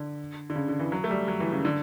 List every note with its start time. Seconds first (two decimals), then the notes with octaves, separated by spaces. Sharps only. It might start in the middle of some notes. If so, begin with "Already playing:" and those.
Already playing: D3
0.50 D3
0.56 C#3
0.68 D3
0.79 E3
0.92 F#3
1.04 A3
1.11 G3
1.28 F#3
1.40 E3
1.53 C#3
1.65 D3